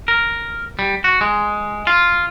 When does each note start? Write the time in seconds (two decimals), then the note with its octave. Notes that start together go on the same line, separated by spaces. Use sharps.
0.08 A#4
0.79 G3
1.04 F#4
1.21 G#3
1.87 F4